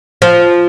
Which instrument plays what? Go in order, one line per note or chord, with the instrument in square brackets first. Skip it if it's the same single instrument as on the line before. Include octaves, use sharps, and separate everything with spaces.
[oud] F3